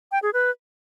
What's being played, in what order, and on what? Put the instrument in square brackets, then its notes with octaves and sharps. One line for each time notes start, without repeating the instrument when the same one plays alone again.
[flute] G5
G#4
B4